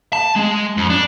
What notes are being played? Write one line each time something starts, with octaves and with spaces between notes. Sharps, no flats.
A5
G#3
F2
D4